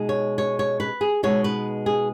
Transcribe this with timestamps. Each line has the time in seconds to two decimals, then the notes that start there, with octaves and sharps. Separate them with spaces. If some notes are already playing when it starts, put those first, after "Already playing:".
Already playing: B2 G#3 D#4
0.09 C#5
0.38 C#5
0.59 C#5
0.80 B4
1.01 G#4
1.23 B2 G#3 B3 D#4 C#5
1.44 B4
1.86 G#4